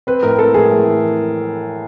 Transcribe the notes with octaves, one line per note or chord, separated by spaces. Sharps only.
C4 B4
A2 A#4
C4 A4
A2 G#4
A3
E3